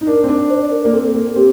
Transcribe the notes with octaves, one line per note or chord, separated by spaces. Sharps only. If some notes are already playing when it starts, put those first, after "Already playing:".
D#4
D4 A#4
C4
D4
C5
D5
A#4
A#4
A#3
C4 A4
A#3
C4 G4